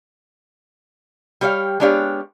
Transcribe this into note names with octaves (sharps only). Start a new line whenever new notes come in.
G3 G4 C#5 E5 F5
G#3 B3 D4 G4 C#5 F5